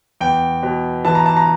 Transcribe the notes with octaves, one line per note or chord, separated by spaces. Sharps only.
E2 G5
B2
E3 A5
A#5
A5
A#5